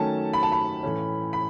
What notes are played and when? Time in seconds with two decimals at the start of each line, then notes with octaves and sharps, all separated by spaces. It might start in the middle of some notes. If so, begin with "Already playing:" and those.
Already playing: D#3 F#3 A3 C#4 A5
0.33 B5
0.43 A5
0.52 B5
0.83 A2 E3 A3 C#4
1.33 B5